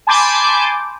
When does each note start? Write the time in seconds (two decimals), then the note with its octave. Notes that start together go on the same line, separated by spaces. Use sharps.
0.07 G#5 A5 B5 C6 D6 G6